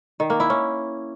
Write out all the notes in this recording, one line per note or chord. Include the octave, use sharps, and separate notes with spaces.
D#3
A#3
E4
C#4